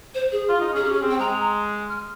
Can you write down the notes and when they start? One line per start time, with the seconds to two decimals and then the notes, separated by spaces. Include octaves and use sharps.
0.15 C5
0.32 G#4
0.49 F4
0.61 D#4
0.73 C#4
0.76 G#4
0.84 C#4 G4
0.93 G#4
1.02 C4
1.11 G5
1.19 G#3 A#5
1.89 F6